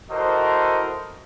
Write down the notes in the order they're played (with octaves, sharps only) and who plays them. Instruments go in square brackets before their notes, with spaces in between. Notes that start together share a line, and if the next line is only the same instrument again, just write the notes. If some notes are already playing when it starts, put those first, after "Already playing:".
[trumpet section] E4 F#4 A4 A#4 C5 D#5